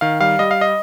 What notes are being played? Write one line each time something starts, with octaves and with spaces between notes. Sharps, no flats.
D#3 F5
G3 F5
G3 D#5
F5
D#5